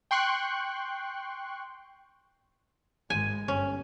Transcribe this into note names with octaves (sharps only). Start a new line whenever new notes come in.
G5 C6 C#6 F#6
G#1 G#3 G#5
G1 C#4